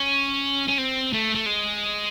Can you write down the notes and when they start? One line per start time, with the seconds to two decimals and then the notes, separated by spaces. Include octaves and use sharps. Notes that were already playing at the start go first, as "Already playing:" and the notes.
Already playing: C#4
0.68 C#4
0.78 C4
1.13 A3
1.35 A3
1.46 G#3